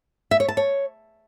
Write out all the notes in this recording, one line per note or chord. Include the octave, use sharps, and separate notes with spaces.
E5
C#5
A5
C#5